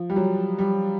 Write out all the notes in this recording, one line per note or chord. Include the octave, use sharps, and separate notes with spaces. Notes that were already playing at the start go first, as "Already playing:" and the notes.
Already playing: F3
G3
F#3
G3